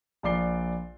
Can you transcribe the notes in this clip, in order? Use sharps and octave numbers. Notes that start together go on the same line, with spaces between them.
A#1 F4 D5 D6 C7 G7